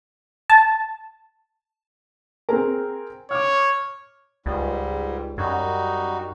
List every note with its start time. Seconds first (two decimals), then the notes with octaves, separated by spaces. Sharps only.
0.50 A5
2.49 C4 G#4 A#4
3.31 C#5 D6 F6
4.46 C#2 G#2 G3
5.38 F#2 G3 D#4 F#4